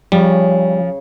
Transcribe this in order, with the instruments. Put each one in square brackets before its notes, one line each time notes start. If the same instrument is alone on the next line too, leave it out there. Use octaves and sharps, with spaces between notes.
[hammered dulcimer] C#3 [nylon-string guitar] F3 [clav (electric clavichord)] G3